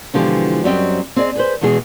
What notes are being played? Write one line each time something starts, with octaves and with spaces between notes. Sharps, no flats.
B2 D3 E3 F3 G#3 G4
F#2 F#3 G3 C4 D#5 G5
C4 G#4 D5 D#5
G#4 B4 C5
E2 B2 E3 G#3 G#4